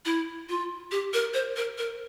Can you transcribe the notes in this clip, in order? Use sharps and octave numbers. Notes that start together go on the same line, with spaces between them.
E4
F4
G4
A#4
C5
A#4
A#4